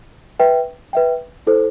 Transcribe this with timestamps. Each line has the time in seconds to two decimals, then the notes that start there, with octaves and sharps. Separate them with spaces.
0.39 B4 E5 G5
0.93 B4 E5 G5
1.47 E4 A4 C5